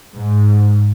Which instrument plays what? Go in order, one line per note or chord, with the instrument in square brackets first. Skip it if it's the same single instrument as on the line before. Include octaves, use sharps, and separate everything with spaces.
[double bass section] G#2